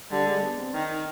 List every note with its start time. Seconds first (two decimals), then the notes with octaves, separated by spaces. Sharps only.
0.11 D3 G3
0.27 G#3
0.42 B3
0.58 C4
0.74 D#3 D#4
0.90 D#4